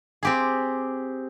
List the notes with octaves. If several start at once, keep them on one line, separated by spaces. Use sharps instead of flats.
C4 G4 G#4